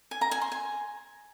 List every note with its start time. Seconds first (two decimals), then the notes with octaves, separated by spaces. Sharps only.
0.11 G#5
0.21 A#5
0.31 G#5
0.42 C6
0.52 G#5